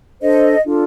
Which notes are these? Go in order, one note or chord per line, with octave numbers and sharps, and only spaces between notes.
D4 A4 C5 D#5
D4 F4 A4